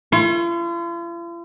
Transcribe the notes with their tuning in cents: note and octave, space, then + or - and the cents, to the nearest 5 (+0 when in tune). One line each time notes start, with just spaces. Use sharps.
F4 -45 C6 +45